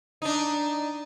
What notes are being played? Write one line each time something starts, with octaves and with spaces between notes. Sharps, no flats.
D4 D#4